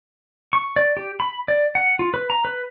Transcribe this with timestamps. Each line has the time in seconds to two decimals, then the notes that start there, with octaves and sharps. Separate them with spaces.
0.53 C#6
0.76 D5
0.97 G4
1.20 B5
1.48 D5
1.75 F#5
1.99 F4
2.14 B4
2.30 A#5
2.45 B4